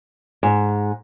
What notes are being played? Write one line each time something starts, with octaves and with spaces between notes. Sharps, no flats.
G#2